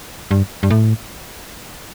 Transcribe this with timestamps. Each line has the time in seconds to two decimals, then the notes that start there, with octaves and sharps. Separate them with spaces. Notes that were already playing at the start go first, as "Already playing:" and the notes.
0.31 G2
0.63 G2
0.70 A2